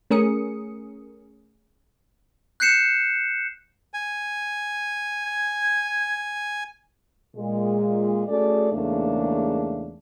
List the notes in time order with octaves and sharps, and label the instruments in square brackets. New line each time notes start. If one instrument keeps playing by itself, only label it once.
[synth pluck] A3 C#4 G#4 A#4 D#6 C#7
[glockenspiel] F#6 G6 C7 C#7 E7
[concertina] G#5
[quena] G#6
[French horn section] A#2 G#3
A3 C#4 F#4 G#4 A4 D5
E2 G#2 C#3 A3 A#3 D4